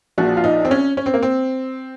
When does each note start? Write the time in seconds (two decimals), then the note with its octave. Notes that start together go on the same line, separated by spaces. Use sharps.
0.18 A#1 A#2 F3 F#4
0.37 F4
0.44 D#4
0.65 C4
0.71 C#4
0.97 C#4
1.06 C4
1.14 A#3
1.23 C4